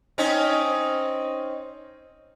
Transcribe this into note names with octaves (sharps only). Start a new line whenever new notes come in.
C4 C#4 D#4